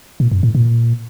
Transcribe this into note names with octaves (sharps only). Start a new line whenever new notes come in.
A#2
F#2
A2
A#2